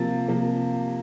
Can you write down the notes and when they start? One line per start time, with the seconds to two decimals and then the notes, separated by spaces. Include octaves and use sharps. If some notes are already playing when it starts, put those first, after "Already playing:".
Already playing: C3 F3 A#3 A6
0.28 C3 F3 A#3